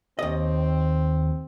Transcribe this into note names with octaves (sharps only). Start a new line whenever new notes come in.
D#2 C4 D#5